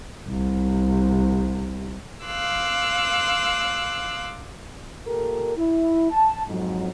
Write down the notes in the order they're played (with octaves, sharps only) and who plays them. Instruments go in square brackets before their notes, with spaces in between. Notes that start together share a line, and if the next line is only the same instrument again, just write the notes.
[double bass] C2 C3
[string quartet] F5 C6 D6 E6 F#6
[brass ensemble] A#2 G4 A4 A#4
E4
A5
F2 G#2 F#3